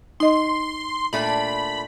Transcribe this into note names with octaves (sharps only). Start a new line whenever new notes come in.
D#4 D#5 C6
A#2 A3 D4 B5